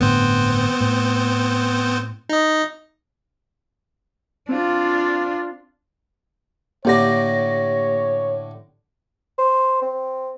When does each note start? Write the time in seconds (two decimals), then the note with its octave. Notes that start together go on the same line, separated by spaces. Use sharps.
0.01 G1 A2 D3 B3 C4 C5
0.81 A2
2.29 D#4 D#5
4.49 C4 D4 F4 C5 F5
6.85 A2 D3 A#3 D4 G4 C#5 A#6
9.39 C5
9.82 C4